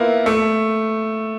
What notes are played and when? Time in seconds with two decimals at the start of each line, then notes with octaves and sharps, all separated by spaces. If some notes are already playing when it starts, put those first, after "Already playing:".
Already playing: A#3 B3 E4 F4
0.26 A3